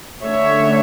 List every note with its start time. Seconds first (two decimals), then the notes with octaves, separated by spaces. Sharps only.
0.25 D3 A3 C#4 C#5 E5